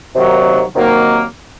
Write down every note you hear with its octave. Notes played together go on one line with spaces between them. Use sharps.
C3 D#3 F#3 A#3
C3 D#3 F#3 A#3